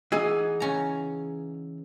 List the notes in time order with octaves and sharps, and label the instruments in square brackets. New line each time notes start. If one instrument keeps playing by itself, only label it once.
[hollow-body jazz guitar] E3 B3 D#4 [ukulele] G#4 G#5
[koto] C#3 C#4 A#5